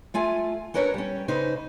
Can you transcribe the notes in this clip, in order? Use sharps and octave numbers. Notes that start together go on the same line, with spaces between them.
A3 F4 G#5
C#4 D4 A#4 B4 C#5
G3 C#4
C#3 D#4 B4 C5